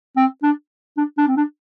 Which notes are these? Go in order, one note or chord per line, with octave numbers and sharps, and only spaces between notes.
C4
D4
D4
D4
C4
D4